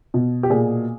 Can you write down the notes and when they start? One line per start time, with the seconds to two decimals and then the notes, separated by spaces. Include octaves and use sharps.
0.14 B2
0.43 G4
0.50 A#2 G#4